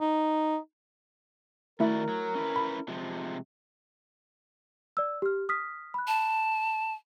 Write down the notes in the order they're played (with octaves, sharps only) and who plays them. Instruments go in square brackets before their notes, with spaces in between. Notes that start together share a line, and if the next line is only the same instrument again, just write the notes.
[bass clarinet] D#4
[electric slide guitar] D#3 F#4 D5 [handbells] A3 E4 E5 [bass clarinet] A#4
[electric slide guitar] F#3
C#4 E4 B4
[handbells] B5
[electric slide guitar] C3 F3 G#3
[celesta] D5 E6
G4 F6
D#6 F6 B6
B5 F#6
[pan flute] A5